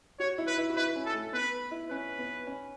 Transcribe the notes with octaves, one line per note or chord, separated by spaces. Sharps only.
F#4 C#5
E4
B4
E4
F#4
E4 B4
C#4
A4
A3
B3 B4
E4
C#4 B4
B3
C#4